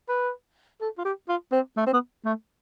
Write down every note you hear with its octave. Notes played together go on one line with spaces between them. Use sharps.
B4
A4
F4
G4
F4
C4
A3
C4
B3
A3